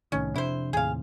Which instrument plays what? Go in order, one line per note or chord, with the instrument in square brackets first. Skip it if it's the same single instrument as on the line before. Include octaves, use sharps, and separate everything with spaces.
[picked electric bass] C2 A2 D#3 [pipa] C#4
[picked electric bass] F2 C3 D4 [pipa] E4 C5
[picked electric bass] D#2 A2 C3 [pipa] G#4 F5